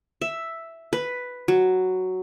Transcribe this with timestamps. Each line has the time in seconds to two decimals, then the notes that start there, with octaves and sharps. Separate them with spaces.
0.22 E5
0.93 B4
1.48 F#3